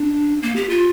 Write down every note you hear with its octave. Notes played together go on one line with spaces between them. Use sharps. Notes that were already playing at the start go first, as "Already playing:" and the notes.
Already playing: D4
A#3
G4
F4